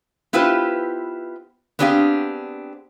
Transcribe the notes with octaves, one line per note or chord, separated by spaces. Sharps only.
B3 E4 F4 G4 B4 C5
B3 C4 D4 G4 G#4 F5